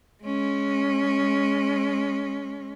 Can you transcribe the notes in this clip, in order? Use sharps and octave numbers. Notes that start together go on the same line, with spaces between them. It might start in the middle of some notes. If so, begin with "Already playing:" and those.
G#3 C#4